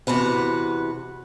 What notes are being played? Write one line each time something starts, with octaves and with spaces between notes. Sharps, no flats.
E2 C3 F#4 B4 F#5